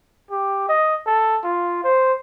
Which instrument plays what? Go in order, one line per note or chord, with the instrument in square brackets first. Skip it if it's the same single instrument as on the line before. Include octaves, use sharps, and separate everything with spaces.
[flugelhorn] G4
D#5
A4
F4
C5